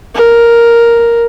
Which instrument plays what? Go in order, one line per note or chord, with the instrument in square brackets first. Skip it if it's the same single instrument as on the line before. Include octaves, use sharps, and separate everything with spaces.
[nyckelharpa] A#4